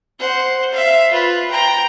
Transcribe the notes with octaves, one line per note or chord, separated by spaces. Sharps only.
C5 F#5
E5 F5
F4 B4
G5 A#5